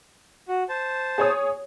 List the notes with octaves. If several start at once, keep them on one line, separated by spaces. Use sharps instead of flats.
F#4
C5 A5
G#4 C#5 D#6